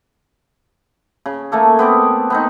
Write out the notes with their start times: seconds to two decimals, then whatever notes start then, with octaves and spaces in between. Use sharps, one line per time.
1.26 C#3
1.52 A3 A#3 A4
1.79 B3 C4 D6
2.30 B3 C4 D#4